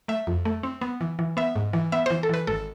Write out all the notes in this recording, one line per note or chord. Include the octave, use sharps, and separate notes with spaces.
A3 E5
F2
A3
C4
B3
E3
E3
B3 E5
G#2
E3
B3 E5
C5
E3
A4
E3 B4
G#1 A4